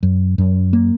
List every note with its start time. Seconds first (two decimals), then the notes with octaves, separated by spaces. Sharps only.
0.03 F#2
0.38 F#2
0.73 A#3